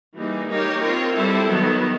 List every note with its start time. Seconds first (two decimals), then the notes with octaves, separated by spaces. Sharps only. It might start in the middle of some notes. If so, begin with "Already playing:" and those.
0.15 E3 G3 A#3 D#4 G#4
0.48 A#3 D#4 G4 A#4 C#5
0.82 C4 F4 A#4 C#5
1.15 G3 C4 E4 A4
1.49 D#3 F#3 B3